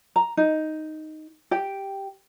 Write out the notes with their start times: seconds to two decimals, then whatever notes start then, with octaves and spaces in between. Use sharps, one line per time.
0.16 A#5
0.37 D#4
1.51 G4 G5